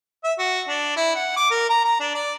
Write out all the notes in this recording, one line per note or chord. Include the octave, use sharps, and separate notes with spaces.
E5
F#4
D4
E4
F#5
D6
A#4
A#5
A#5
D4
D5